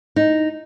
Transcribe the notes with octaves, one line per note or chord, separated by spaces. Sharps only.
D#4